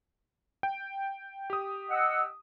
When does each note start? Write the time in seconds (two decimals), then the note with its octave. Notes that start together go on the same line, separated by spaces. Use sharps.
0.63 G5
1.50 G4 D#6
1.90 D#5 F#5 E6